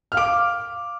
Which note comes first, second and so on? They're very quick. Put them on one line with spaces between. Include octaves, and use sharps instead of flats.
F6 F5 D6